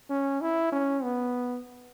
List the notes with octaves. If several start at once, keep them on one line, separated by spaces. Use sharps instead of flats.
C#4
E4
C#4
B3